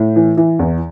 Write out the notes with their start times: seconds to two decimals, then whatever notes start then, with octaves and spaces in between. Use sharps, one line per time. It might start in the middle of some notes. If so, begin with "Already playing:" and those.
Already playing: A2
0.16 E3
0.37 E3
0.59 E2